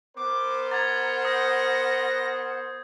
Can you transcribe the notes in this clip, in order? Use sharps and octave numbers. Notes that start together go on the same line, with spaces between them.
B3 A#4 C5 D6
F#5 A#5 G#6 A6
D#6 G6 A#6